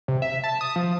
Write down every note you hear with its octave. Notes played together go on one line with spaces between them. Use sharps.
C3
E5
A5
D#6
F3